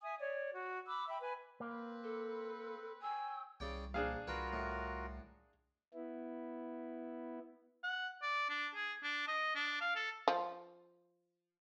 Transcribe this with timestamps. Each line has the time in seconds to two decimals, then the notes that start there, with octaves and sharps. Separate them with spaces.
0.02 E5 G#5 D#6
0.20 C#5 D5
0.52 F#4
0.86 B5 D6 E6 F#6
1.08 E5 G5 B5
1.21 B4 G#5 B5
1.60 A#3 C4 B4
2.04 A4
3.02 C#5 G5 G#5 E6
3.60 C2 C#3 D5 G5
3.94 A#1 D4 G#4 F5
4.27 C2 F4 F#4 A#4 B4 G5
4.53 A2
5.94 B3 E4
7.83 F#5
8.22 D5
8.49 D4
8.75 G#4
9.03 D4
9.28 D#5
9.55 D4
9.81 F5
9.95 A4
10.28 F3